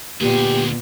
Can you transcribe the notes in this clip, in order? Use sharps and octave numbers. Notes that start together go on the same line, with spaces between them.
D2 A#2 B3 G4 G#4